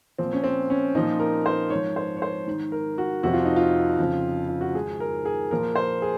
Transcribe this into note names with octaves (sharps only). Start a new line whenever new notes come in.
A#2 F3 C4
C#4
C4
C#4
A#2 F3 D#4
A#4
C5
G#2 F3 C#5
C5
C#5
C5
G#2 D#3
A#4
F#4
F2 C3 F3 F#4
F4
D#4
F4
F2 C#3 F3
F4
F#4
G#2 D#3 G#4
A#4
G#4
A#2 F3 A#4
C5
G#4